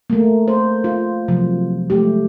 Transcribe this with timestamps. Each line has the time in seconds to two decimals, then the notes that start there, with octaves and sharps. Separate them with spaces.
0.10 A3 A#3
0.48 C5
0.84 F4
1.28 C3 F3 F#3
1.90 G#3 A3 G4